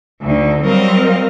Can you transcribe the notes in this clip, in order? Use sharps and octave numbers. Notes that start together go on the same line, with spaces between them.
D2 D3 D#4
F#3 G3 C4 A#4 D#5 F5